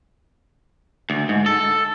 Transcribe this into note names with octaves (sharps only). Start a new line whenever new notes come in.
D2
G#2
A4